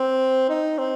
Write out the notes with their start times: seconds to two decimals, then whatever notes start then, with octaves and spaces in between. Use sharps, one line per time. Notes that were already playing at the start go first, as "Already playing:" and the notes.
Already playing: C4
0.49 D#4
0.78 C4